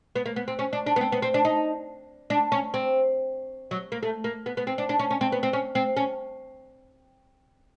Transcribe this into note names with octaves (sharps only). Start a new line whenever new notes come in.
B3
A#3
B3
C4
C#4
D4
D4
B3
C4
B3
C4
D4
D#4
D4
C#4
C4
F#3
A#3
A3
A#3
B3
B3
C4
D4
D4
C#4
C#4
C4
B3
C4
C#4
C4
C#4